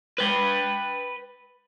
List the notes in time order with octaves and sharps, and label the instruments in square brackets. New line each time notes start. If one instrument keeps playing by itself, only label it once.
[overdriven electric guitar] B4 G5